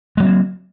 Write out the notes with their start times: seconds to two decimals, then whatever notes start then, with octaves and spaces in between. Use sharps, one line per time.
0.17 G#3
0.20 F#3
0.22 C4
0.25 A#3